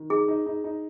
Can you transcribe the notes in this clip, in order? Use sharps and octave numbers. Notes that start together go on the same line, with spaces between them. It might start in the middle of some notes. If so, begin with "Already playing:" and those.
Already playing: D#3
D#4 G#4
D#4
D#4
D#4